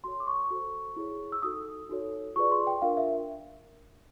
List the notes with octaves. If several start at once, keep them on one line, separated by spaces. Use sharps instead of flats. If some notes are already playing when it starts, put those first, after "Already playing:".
F#4 A4 C#5 C6
D6
C#6
F#4 A4 C5
E4 G#4 C#5
E6
D#4 F#4 A4 D#6
D#4 F#4 A4 C#5
F4 G#4 B4 D5 C#6
C6
G5
D4 F4 A#4 F5
E5